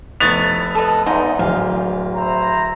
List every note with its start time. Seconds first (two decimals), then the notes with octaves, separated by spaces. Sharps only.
0.20 F1 B3 D#5 C#6 A6 F7
0.75 A4 B4 D#5
1.06 E2 G#2 D#4
1.39 D1 F5
2.15 E4 C5 A#5